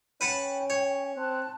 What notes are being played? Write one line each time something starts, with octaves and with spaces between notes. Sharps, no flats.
C#4 B4 F#5 G5 A5
C#5
C4 A5 F#6